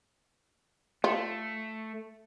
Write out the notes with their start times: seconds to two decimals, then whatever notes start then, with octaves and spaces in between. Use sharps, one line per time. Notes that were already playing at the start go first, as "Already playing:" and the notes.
1.04 A3 F4